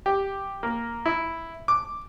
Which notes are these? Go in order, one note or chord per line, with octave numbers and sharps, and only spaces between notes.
G4
A#3
E4
D6